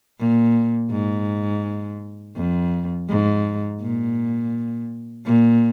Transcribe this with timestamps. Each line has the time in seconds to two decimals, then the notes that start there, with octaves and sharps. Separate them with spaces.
0.19 A#2
0.91 G#2
2.36 F2
3.09 G#2
3.81 A#2
5.26 A#2